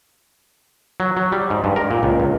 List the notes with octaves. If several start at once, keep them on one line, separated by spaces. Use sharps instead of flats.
F#3
F#3
G3
G#2
G2
A#4
A#2
C#2
C#2